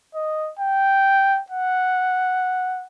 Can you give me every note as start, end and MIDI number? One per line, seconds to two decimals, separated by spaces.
0.15 0.50 75
0.59 1.40 79
1.50 2.87 78